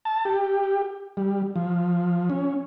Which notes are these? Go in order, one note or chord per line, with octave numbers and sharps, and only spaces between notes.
A5
G4
G3
F3
C#4